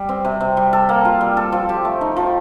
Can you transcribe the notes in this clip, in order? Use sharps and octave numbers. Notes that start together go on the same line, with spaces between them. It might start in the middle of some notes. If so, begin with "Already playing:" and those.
Already playing: G3
C4
C3
C3
G3
A4
A#3
F4
G3
A4
F3
G4
A3
D#4
F3